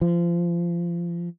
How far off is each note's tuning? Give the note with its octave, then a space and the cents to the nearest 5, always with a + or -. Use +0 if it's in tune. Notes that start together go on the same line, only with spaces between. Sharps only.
F3 -25